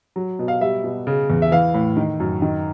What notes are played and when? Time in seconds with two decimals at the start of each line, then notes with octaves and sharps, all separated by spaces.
0.16 F#3
0.39 B2
0.48 F5
0.61 G3 E5
0.84 B2
1.07 C#3
1.30 E2
1.42 E5
1.52 E3 F5
1.74 A2
1.97 D#3
2.20 F#2
2.42 D#3